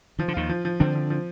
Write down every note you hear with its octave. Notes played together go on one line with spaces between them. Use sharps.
D#3 F3
D3
D#2 D#3 F4
F3
F3
D3 C4 D4
F3
F3